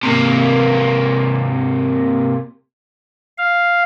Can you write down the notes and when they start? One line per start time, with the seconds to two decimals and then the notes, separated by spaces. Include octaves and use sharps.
0.03 C3 A#3
3.38 F5